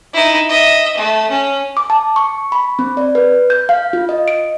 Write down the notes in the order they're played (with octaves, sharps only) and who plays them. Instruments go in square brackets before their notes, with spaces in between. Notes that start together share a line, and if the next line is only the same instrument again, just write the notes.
[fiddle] D#4 E4
D#5 E5
A3
C#4
[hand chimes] D6
A5
C#6
B5
C4
D5
B4
G6
F5
F4
D#5
D7